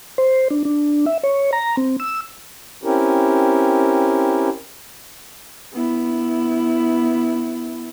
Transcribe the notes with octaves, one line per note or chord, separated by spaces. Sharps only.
C5
D4
D4
E5
C#5
A#5
C4
E6
C4 C#4 E4 G4 A#4
B3 E4